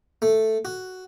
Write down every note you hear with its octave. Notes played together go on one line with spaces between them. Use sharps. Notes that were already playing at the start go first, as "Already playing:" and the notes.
A3
F#4